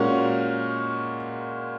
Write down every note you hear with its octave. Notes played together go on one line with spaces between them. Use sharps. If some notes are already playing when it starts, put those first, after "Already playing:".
Already playing: A#2 G#3 C#4 F#4 A#4